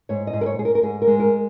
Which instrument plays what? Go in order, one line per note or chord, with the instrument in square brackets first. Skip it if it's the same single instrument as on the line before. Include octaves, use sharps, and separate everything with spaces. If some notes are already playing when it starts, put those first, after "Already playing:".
[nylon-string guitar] G#2 C#5
D#5
G#2
A#4
C#5
G#2 G#4
A#4
A#4
G#2 G#4
A#4
G#3
A#4